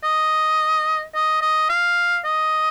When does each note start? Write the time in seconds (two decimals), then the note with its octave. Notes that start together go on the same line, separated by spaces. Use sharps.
0.04 D#5
1.15 D#5
1.42 D#5
1.69 F5
2.25 D#5